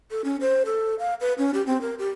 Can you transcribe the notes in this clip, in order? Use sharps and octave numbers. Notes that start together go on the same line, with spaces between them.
A4
C#4
C5
A4
F5
B4
C#4
G4
C4
A#4
G4